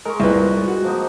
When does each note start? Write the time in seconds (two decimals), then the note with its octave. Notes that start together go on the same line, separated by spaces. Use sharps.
0.05 G#3 A#4 C#6
0.20 C2 A#2 B4
0.67 F#4
0.84 F3 A#3 D#4